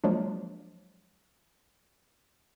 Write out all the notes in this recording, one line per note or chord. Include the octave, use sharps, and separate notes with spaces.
F3 F#3 G#3 A#3 D4